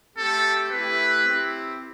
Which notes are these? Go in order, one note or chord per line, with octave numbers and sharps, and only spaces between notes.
A3 C4 G4 A4
A3 E4 G4 B4
C4 E4 G4